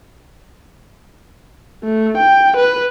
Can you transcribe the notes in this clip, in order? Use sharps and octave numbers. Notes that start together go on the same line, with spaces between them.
A3
G5
B4